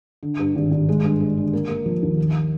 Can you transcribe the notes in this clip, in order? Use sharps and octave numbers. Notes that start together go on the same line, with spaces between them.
D3
G2
G#1
G#1
G#3
G2
G#3
D3
A#3
A#3
F3
D#2
D#3